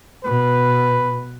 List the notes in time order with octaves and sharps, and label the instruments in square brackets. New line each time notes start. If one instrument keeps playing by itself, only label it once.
[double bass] B2 [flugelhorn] B4